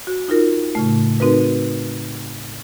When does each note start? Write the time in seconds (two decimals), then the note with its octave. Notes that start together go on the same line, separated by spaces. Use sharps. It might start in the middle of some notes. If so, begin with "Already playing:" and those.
0.07 F#4
0.28 D#4 F4 A#4
0.75 A2 C#3 A3
1.20 C4 D#4 F#4 A#4 B4